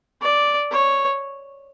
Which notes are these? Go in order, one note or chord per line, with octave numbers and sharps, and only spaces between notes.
D5
C#5